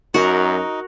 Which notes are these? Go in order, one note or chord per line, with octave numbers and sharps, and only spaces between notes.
F#2 D#4 F#4 A#4